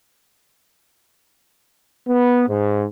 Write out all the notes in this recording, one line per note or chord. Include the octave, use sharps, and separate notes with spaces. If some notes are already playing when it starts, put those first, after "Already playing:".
B3
G#2